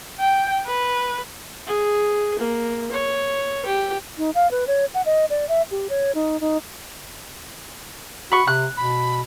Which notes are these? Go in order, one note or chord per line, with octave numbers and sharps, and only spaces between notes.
G5
B4
G#4
A#3
C#5
G4
D#4
F5
B4
C#5
F#5
D#5
D5
E5
G4
C#5
D#4
D#4
F#4 B5 C#6
C3 F#6
B2 B5